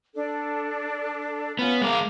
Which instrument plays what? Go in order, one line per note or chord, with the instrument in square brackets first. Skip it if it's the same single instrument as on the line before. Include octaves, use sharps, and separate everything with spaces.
[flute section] D4 A4
[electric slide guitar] B3 [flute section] C#4 F4 F#5
[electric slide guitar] G#3 A#4 [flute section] F5 D6